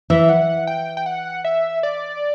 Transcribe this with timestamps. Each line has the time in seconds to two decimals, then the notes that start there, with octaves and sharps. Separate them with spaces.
0.10 E3 E5
0.29 F#5
0.67 G5
0.97 G5
1.06 F#5
1.44 E5
1.83 D5